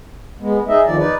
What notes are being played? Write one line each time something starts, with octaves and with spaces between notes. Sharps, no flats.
G#3 B3
D#4 G#4 D#5 E5
E2 D#3 F3 D5
D#4 B4 D5